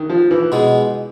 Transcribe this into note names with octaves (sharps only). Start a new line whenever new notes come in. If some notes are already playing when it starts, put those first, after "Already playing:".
Already playing: D#3
F3
E3
B2 G#3